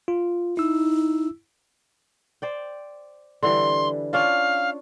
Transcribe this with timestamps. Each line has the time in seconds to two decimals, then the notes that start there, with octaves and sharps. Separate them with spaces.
0.08 F4
0.57 D#4 E4 E6
2.42 C5 D5 G5
3.43 D3 E3 G3 C6
4.13 C#4 D4 F4 F5